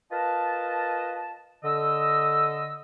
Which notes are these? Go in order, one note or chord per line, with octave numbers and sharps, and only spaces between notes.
F4 A#4 B4 D#5 A5
D3 D#5 E6